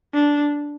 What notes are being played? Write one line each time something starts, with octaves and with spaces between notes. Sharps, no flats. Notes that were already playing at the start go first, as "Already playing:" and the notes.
D4